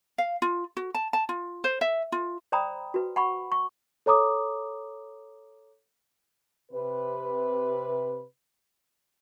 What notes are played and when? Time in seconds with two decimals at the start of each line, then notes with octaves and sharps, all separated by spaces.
0.18 F5
0.42 F4
0.77 F#4
0.94 A5
1.13 A5
1.29 F4
1.64 C5
1.81 E5
2.12 F4
2.52 C5 D5 G5 A#5 B5 D#6
2.94 F#4 B4
3.16 F#5 B5 C#6
3.52 C#6
4.06 A4 C#5 A#5 D6 D#6
6.72 C3 B4